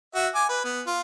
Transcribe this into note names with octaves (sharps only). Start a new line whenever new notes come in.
F#4 E5
G#5 D6
B4
B3
F4